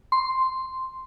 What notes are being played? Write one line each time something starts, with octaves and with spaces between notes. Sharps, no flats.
C6